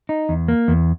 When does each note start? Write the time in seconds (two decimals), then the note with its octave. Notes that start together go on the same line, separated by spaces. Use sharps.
0.09 D#4
0.29 E2
0.48 A#3
0.68 E2